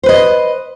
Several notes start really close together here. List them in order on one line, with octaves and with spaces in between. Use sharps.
C5 B4 D#5